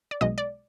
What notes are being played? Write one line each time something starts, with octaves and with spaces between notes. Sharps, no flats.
D5
B1 B2 G#3 D#5
D5